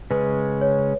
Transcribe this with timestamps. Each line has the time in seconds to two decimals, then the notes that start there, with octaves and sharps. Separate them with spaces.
0.10 C#3 G#3 C#4 B4
0.61 C#5